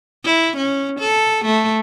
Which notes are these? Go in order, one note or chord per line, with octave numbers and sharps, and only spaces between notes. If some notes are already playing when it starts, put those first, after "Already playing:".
E4
C#4
A4
A3